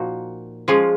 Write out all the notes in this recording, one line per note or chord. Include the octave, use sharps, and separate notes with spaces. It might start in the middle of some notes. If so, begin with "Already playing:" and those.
Already playing: A#2 F3 A#3 D#4 F#4
F3 G#3 C#4 F4